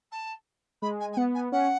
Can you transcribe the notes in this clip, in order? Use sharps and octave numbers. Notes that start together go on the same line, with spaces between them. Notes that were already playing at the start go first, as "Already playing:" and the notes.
A5
G#3 B5
G#5
G#5
B3 F#5
G#5
C#4 F#5